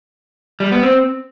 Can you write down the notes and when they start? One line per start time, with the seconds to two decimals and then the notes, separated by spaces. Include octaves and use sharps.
0.60 G3
0.71 B3
0.83 C4